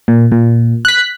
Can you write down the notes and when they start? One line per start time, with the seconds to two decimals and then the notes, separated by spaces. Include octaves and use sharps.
0.08 A#2
0.32 A#2
0.85 F#6 B6